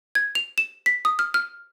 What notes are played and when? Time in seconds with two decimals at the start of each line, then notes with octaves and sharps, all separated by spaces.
0.15 G#6
0.35 F7
0.58 E7
0.86 B6
1.05 D#6
1.19 F6
1.34 F6